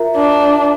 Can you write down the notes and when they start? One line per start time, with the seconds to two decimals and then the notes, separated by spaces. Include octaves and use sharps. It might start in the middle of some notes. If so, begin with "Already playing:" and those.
Already playing: F4 A#4 E5 A#5
0.16 D4